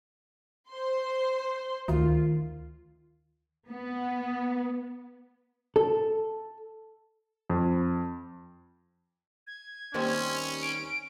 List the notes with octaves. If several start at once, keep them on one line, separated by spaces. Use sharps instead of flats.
C5 C6
D2 D#3 F4
B3
A4
F2
G#6
D#2 G3 C4 C#4
D7